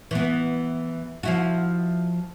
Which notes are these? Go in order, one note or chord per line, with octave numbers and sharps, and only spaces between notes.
E3 B3
F3 E4 F#4